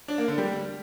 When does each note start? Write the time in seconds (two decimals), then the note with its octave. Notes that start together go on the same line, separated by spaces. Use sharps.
0.08 D4
0.18 A#3
0.28 D3
0.38 G3